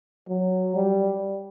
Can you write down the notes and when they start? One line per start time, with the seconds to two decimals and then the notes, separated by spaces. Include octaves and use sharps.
0.29 F#3
0.75 G3